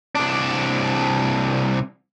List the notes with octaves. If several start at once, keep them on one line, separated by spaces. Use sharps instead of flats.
C2 D4